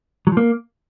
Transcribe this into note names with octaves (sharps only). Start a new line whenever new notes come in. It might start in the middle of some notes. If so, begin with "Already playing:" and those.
F#3
F3
A#3